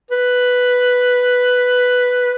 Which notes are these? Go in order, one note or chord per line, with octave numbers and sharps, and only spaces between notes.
B4